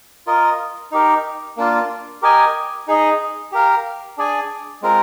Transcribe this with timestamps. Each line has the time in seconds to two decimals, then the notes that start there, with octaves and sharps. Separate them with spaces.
0.27 F4 A#4 D#5
0.92 D#4 G4 A#4
1.57 A#3 D4 F4
2.22 G4 A#4 D#5 G#5
2.87 D#4 G#4 D#5
3.52 G4 A#4 F5
4.17 D4 G#4 D5 G#5
4.82 G#3 C4 F4 A#4